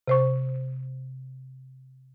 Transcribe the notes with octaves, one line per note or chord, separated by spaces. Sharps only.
C3 C5 C#6